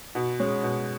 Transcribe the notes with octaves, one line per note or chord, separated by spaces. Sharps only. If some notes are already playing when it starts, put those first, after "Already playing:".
B2
G#3 C#4
B2